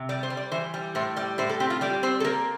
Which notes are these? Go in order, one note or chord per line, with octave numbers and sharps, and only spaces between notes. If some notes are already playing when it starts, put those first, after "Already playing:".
Already playing: C3
G3 D5
C5
G3
D5
E3 C5
G3
A2 C5
G3 D5
A2 C5
A4
C4 G4
F4
G3 D5
C4 C5
A4
A#3 A#4